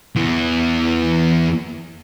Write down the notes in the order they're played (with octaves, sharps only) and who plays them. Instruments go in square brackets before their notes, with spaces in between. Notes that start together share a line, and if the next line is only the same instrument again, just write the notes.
[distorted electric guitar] E2 E3